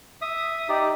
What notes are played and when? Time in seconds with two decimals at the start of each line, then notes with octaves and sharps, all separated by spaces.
0.22 E5 D#6
0.69 D#4 G4 D5